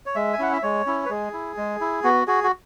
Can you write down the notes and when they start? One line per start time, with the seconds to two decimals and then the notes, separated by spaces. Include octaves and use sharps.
0.06 C#5
0.15 G#3 E5
0.33 G#5
0.39 C#4 E4 F#5
0.53 E5
0.63 G#3 C#5
0.86 C#4 E4
1.05 B4
1.10 G#3 G#4
1.33 E4
1.57 G#3
1.81 E4
2.04 B3 F#4
2.27 F#4 G#4
2.44 F#4